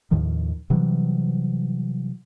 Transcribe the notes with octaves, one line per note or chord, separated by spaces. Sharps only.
D#2 A2 D#3 F3
C3 E3 F#3 G3